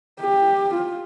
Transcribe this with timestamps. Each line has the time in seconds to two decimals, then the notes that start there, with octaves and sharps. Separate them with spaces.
0.20 G4
0.74 F4